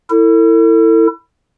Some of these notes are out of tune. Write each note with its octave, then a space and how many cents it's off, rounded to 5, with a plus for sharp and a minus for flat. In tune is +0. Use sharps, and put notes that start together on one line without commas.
E4 +0 A4 +35